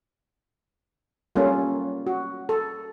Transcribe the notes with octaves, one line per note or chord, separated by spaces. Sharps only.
G3 A#3 C#4 F4 A4
F#4
A4